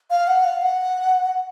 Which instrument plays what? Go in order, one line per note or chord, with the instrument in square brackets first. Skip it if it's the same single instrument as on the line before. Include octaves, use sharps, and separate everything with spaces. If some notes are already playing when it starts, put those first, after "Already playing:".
[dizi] F5
F#5
F5
F#5